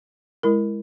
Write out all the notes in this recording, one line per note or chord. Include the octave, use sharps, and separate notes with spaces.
G#3 E4 A#4